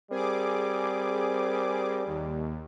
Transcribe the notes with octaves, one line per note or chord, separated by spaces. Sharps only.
G3 C4 G#4 A#4 C5 D6
D#2